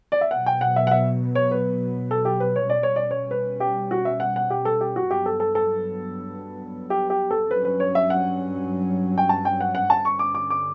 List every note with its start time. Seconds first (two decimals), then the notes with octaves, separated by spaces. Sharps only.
0.12 D5
0.21 E5
0.31 B2 F#3 B3 F#5
0.46 G5
0.61 F#5
0.76 E5
0.87 F#5
0.91 E5
1.35 C#5
1.51 B4
2.11 A4
2.25 G4
2.40 B4
2.56 C#5
2.70 B2 G3 C#4 D5
2.83 C#5
2.96 D5
3.11 C#5
3.31 B4
3.60 G4
3.91 F#4
4.05 E5
4.20 F#5
4.36 F#5
4.50 G4
4.65 A4
4.81 G4
4.96 F#4
5.10 G2 F#3 B3 G4
5.26 A4
5.40 A4
5.55 A4
6.90 G4
7.10 G4
7.31 A4
7.50 G2 F#3 C#4 B4
7.65 B4
7.80 C#5
7.95 E5
8.10 F#5
9.18 G5
9.29 A5
9.45 G5
9.61 F#5
9.75 F#5
9.90 G2 D3 G3 C#4 A5
10.05 C#6
10.19 D6
10.35 D6
10.50 D6